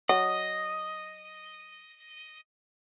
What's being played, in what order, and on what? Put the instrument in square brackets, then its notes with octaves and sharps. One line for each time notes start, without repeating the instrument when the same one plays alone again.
[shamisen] F#3 [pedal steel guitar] D#5